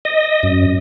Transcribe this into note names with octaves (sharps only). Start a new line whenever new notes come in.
D#5
F#2